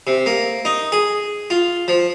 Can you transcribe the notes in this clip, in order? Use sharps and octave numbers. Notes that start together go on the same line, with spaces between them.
C3
A#3
D#4
G#4
F4
F3